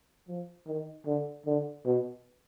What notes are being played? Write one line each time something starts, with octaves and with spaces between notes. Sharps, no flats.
F3
D#3
D3
D3
B2